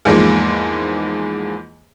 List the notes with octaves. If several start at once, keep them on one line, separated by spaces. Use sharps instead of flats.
E2 G#2 F3 G#3 A#3